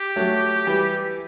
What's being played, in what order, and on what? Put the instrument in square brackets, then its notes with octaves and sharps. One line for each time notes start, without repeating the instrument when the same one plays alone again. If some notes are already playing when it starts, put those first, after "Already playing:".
Already playing: [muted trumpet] G4
[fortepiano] F#3 A3
E3 G3